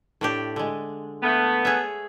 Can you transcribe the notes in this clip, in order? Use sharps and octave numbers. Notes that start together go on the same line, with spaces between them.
A2 D4 G4
D3 G#3
A3 B3
G#4 C#5 E5